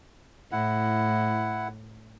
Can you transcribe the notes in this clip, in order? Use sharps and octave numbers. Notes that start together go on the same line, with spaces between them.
A2 E4 F#5